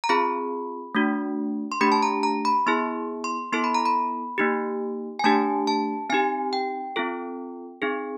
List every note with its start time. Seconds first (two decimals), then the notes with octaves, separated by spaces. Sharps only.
0.04 A#5
0.09 C4 F4 G#4 B5
0.95 A3 D4 F#4
1.72 C6
1.81 A3 D4 G4 B5
1.92 A5
2.02 A#5
2.23 A#5
2.45 B5
2.66 B3 E4 G#4 C6
3.24 C6
3.52 B3 E4 A4 C6
3.64 B5
3.74 A#5
3.85 B5
4.38 A#3 D#4 G4
5.19 G#5
5.24 A3 D4 G4 A5
5.67 A5
6.10 C4 D#4 G4 G#5
6.53 G5
6.96 C4 F4 A4
7.82 C4 D#4 G#4